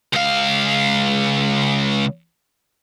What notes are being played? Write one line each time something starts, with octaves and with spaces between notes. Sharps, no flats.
C#2 F5